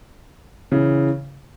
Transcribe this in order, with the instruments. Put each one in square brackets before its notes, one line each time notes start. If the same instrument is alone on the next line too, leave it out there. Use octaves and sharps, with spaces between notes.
[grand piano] C#3 E3